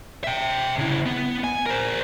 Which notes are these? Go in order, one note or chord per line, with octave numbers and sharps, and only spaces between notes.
E5 G5
C#3 E4
B3
G#5
A#4 C5